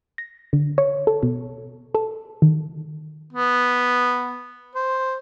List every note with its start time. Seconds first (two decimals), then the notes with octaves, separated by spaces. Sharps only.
0.18 A#6
0.53 D3
0.78 C#5
1.07 A4
1.23 B2
1.95 A4
2.42 D#3
3.33 B3
4.75 C5